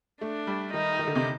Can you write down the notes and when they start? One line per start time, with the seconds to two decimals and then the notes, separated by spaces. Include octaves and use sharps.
0.21 A3 D4
0.47 G3
0.73 D#3 D#4
0.99 D#3
1.07 D3
1.15 C3